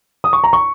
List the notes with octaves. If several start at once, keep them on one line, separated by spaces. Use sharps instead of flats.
D#6
C#6
A#5
C#6